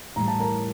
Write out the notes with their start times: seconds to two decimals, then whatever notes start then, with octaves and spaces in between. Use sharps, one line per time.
0.16 A2 E3 G3 A#5
0.28 A5
0.40 A#4 A#5